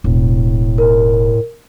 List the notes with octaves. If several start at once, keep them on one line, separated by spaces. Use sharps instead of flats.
E1 A2
A#4